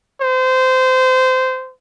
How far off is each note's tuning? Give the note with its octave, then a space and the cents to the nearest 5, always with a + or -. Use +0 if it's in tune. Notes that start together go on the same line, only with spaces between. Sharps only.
C5 -20